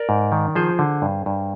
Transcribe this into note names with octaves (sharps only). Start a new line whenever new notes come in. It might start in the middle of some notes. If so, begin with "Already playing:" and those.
Already playing: A#4 D5
G#2
D#3
F3 G#4 C5
D3
G2
G2